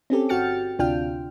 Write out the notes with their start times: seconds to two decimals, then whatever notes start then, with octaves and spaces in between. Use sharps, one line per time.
0.10 C4 C#4 G4 A4
0.29 G1 F#4 G5 F6 A6 C#7
0.79 D2 C3 D4 F4 G5 F6